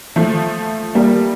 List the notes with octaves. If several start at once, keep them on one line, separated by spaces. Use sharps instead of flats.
F3 A3
G3 A#3